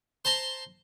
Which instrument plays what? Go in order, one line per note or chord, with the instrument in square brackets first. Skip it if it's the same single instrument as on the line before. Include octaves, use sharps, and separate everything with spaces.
[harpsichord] C5 A5 A#5 C6